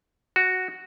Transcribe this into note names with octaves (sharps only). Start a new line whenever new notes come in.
F#4